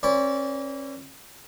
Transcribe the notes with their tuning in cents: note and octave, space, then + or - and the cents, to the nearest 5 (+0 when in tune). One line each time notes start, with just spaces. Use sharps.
C#4 -35 B4 +0 D5 -35